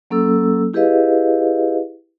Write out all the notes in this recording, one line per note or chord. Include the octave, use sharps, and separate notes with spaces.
F#3 A#3 C#4 A4 E6
E4 G4 G#4 B4 D#5 F5